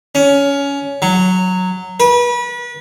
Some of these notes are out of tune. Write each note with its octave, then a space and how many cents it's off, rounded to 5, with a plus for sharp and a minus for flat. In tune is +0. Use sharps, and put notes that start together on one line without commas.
C#4 +20
F#3 -5
B4 -30